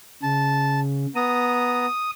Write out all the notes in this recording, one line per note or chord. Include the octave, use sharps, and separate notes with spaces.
C#3 A5
B3 A#5 D#6